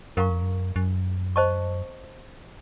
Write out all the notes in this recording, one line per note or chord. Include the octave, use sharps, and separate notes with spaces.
F#2 A#4 F5 A#5 C#6
F2
F#2
F#2
C5 D#5 A5 C#6